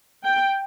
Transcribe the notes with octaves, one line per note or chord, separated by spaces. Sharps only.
G5